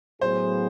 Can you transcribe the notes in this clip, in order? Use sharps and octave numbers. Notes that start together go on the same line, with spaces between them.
A2 F#3 B3 E4 G#4 C5